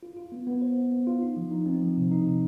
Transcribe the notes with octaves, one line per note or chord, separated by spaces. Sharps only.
F4
F4
B3
B3
C5
B3
B3
F4
D#4
F3
D#4
C4
F3
C3
D#4
C3